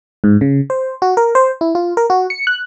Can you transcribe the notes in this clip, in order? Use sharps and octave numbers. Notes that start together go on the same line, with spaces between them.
G#2
C#3
C5
F#4
A#4
C5
E4
F4
A#4
F#4
C#7
F#6